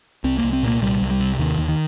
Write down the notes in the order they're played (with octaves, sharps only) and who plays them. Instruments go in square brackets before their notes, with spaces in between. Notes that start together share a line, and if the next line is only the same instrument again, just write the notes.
[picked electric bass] C2 C4
A#3
C2
C4
A#2 A#3
C2 G3
C2
G3
C3
D#2 D#3
D#2
D#3